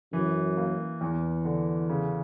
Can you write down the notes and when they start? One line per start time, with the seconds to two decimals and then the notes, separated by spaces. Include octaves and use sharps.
0.13 F#2 E3
0.57 A#3
1.01 E2 E3
1.45 D3
1.89 C#3